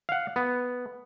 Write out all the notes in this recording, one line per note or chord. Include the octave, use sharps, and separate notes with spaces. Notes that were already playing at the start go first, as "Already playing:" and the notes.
F5 F#5
B3